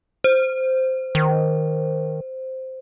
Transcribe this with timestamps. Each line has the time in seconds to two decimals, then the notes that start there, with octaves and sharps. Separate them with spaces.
0.24 C5
1.15 D#3